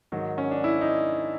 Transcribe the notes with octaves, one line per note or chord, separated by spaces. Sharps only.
G#2 D#3 F#3
C#4
D4
E4
D#4